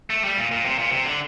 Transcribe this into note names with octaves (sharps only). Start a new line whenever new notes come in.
A3
G3
A#2
A#2
C3
A#2
C3
D3